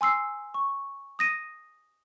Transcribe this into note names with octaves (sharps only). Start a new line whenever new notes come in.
G#5 C6 E6 C7
C#6
D#6 A#6 D#7